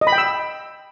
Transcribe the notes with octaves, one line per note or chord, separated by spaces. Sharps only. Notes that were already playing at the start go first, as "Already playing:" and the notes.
D#5
B5
G5
E6